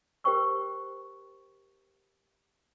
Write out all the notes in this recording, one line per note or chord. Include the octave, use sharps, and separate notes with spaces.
G4 A#4 C5 G5 C#6 E6